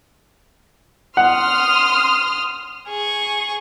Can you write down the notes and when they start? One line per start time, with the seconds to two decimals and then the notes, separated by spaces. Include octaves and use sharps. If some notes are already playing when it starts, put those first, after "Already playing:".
1.17 F#5 C6 D#6 F6
2.90 G#4 C#6